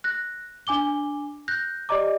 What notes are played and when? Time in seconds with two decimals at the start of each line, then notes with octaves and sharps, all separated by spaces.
0.04 F#6 A#6
0.67 D4 G#5 D6 G7
1.48 F#6 G6 A#6
1.89 G4 D5 D#5 A#5 D6